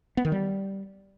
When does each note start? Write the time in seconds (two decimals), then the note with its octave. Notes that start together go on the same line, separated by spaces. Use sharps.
0.17 B3
0.25 D#3
0.32 G3